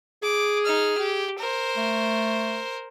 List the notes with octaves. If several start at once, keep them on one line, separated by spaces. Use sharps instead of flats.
G#4 D6
D#4 F6
G4
A#4 C5
A3